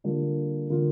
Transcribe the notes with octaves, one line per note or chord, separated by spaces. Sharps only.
D3 G3 A#3 D4 F4
D3 A#3 F4